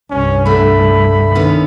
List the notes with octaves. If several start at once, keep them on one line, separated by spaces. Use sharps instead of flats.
C2 G2 C#4
D3 A3 B5
D3 D#3 B3 C#4